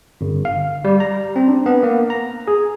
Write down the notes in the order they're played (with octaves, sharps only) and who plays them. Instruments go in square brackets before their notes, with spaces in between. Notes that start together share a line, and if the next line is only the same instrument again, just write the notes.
[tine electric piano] G1
F5
G3
A#5
C4
D4
B3
A#3
A#5
G#4